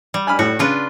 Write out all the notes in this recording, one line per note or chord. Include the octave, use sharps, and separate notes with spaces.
G3
G#5 B5 F6
A2 F#4
C#3 D4 F4 B4